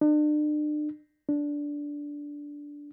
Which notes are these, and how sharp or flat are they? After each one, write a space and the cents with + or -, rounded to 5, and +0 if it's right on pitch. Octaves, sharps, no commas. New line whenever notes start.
D4 +40
D4 -10